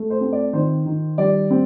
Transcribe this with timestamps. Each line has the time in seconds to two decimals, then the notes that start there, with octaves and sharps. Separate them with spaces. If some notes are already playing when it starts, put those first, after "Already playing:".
Already playing: A3
0.10 C5
0.21 C4
0.32 D5
0.53 D#3 C5
0.86 D#3
1.18 G3 D5
1.51 C4